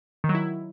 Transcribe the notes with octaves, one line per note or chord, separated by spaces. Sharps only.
D#3
F#3
E4